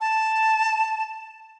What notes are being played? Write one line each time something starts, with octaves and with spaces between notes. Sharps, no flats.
A5